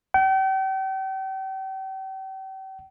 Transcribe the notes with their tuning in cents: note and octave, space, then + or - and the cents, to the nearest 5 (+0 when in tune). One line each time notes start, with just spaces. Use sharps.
G5 -40